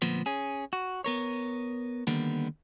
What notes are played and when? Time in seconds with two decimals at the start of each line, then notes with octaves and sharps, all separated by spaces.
0.02 D2 A#2 F3 B3
0.26 C#4 G#4
0.73 F#4
1.04 B3 A#4 C#5
2.07 D3 D#3 G3 A#3 B3